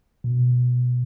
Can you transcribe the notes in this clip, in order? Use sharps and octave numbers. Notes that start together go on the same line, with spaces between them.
B2